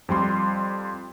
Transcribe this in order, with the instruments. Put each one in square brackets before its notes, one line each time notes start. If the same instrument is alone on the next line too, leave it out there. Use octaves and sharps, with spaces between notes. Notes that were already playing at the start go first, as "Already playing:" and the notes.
[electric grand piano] F2 G3 C6